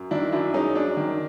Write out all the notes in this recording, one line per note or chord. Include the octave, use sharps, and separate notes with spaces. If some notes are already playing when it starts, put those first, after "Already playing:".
Already playing: F#2
D#3 D4 E4
F#2 D4 E4
G#3 C#4 D#4
F#2 D4
D#3